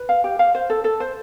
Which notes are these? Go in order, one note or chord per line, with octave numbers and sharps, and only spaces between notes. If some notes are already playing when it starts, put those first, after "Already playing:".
Already playing: B4
F5
G4
F5
C5
A4
A4
C5